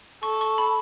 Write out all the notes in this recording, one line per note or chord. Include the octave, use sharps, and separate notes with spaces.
A4 C#6
C#6
B5